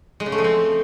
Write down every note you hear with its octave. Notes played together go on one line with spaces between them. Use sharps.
G#3
C#3
A3
F3
C4